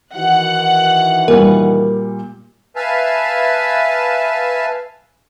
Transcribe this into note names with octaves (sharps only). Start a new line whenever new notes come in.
D#3 E3 F#4 F#5
A#2 G3 A#4
B4 E5 F5 G#5 A5